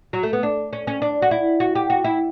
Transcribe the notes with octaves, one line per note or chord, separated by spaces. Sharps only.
F#3
A3
B3
D4
C#4
C#4
D4
F#4
E4
F#4
G4
F#4
E4